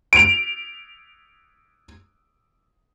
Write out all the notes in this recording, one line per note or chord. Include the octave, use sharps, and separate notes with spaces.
D7 F7